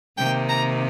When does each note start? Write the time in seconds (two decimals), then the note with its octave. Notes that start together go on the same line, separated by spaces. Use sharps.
0.17 C3 D#3 A#3 G5
0.48 A#5